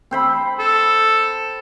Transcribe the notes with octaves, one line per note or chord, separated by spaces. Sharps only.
C4 C5 B5
A4